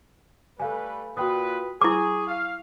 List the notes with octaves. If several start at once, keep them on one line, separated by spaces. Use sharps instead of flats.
G3 A3 A4 B4 F5 G#5
A#2 F4 F#4 B4 G5 D#6
E4 G#4 C#6 D6
F5